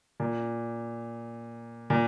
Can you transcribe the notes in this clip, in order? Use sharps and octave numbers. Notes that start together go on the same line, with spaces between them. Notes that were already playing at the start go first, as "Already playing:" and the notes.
A#2
A#2